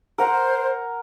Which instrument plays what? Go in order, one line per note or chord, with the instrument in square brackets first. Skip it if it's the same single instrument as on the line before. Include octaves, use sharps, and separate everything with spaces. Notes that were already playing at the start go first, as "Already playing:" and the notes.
[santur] A#4 F#5 A#5 [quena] C5